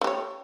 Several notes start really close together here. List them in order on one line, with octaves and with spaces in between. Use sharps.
A3 G4 C#5